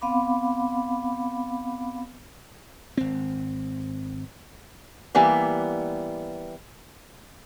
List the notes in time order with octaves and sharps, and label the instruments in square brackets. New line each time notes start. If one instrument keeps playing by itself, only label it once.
[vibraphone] B3 C4 F5 F#5 B5 D6
[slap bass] G#1 C4
[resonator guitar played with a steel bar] E3 G3 A#3 B3